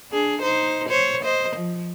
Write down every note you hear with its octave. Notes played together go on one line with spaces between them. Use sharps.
D4 G#4
D#4 C5
C5 C#5
C5 D#5
F3